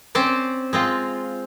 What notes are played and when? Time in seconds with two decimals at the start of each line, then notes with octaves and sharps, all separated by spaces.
0.15 C4 C#4 C5 D5
0.73 G#3 C4 F4